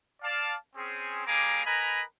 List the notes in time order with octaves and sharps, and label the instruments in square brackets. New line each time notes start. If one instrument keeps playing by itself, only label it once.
[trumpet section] D5 F5 A5
C4 C#4 G#4
G3 A#3 G#4 G#5 A#5 D6
A#4 B4 D#5 G#5 A#5 B5